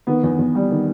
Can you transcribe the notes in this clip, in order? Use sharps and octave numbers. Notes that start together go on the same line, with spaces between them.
D#3 B3
E2
E2
G3
D#3